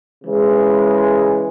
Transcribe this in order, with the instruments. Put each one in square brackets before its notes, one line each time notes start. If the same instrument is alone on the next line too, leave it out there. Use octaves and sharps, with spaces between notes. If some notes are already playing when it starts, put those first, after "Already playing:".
[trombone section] C#3 E3 G#3